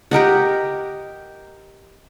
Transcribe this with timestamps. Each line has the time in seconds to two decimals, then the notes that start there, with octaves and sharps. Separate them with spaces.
0.11 G4 A#4 D#5 F#5